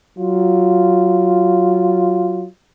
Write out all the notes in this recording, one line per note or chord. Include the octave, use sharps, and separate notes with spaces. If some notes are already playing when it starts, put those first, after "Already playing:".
F#3 F4